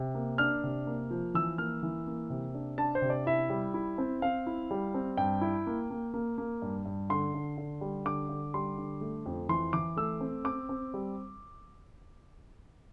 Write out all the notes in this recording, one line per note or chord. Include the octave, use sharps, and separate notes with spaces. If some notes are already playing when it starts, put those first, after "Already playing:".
Already playing: C3
A#3
D4 F6
C3
A#3
F3
E3 E6
A#3 F6
E3
A#3
C3
D4
D4 A5
C5
C3
D5
E4 E5
G3
E4
C4
C4 F5
E4
G3
C4
G2 G5
E4
A#3
A#3
A#3
A#3
G2
G2
D3 C6
D3
D3
G3
D3 D6
D3
G3 C6
D3
A3
F2
E3 C6
E3 D6
A3 E6
C4
C4 D6
C4
G3